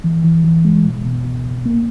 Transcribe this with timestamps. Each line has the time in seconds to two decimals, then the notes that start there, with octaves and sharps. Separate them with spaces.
0.04 E3
0.24 E3
0.44 E3
0.65 G#3
0.84 B2
1.05 B2
1.25 C#2
1.45 C#2
1.66 A#3